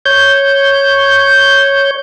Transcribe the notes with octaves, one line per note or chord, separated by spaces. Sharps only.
C#5 G6